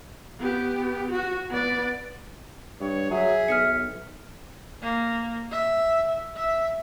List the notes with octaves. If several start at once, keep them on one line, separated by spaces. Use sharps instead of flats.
B3 G4
F#4
B3 D5
G2 C#5
F#3 G#4 E5
B1 F6 B6 C#7
A#3
E5
E5